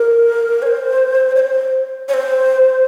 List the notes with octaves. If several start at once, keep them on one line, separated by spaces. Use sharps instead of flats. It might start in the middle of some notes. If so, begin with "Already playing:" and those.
Already playing: A#4
C#5
C5
C#5
C5
C#5
C5